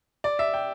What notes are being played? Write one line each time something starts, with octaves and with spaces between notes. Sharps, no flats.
D5
E5
G5